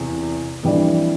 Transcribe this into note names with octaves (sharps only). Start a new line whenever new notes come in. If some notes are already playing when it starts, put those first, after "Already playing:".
Already playing: E2 C3
F2 E3 G3 D4